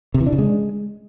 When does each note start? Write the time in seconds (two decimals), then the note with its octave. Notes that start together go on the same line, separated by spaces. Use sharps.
0.14 C3
0.20 E3
0.26 D4
0.33 C#3
0.39 G#3